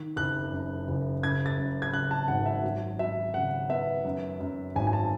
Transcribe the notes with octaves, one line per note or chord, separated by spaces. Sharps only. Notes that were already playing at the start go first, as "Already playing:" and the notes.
Already playing: D#3
F#1 F#6
F#2
F#1
C#3 G#6
A6
F#2
G#6
C#3 F#6
A5
G#1 F#5
E5
F#3
F#3 E5
C#3 F#5
B3 E5
F#2
F#2
G#1 G#5
G#5
A5